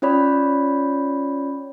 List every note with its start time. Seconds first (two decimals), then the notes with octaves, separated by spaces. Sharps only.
0.02 C#4 F4 C#5 D5 B5